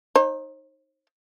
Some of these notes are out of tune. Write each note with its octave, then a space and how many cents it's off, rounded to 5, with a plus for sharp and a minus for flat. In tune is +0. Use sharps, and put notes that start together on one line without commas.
D#4 +0 C5 +45